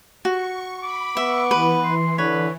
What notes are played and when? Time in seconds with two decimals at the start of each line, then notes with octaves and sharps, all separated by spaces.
0.25 F#4 C#6
0.83 B5 D6
1.17 B3 E5 C#6
1.51 E3 B4
1.84 C6
2.18 D3 B4 C#5